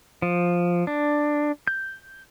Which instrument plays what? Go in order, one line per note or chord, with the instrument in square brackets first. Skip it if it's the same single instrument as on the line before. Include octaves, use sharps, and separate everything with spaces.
[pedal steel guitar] F3
D4
G6